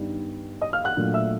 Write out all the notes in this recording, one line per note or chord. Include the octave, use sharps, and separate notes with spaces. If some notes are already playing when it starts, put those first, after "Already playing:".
Already playing: G2 D#3 G3 B3 D#4
D#5 D#6
F5 F6
F#5 F#6
A#2 F#3 A3 D4
E5 E6